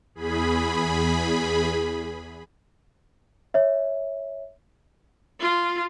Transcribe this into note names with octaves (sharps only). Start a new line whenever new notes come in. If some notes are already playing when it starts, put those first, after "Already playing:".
E2 G#4 B5
C#5 E5
F4